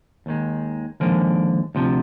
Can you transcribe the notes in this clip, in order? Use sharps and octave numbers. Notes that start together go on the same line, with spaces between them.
D#2 D#3 G#3
D#2 D3 F3 G#3 A#4
D2 C3 F3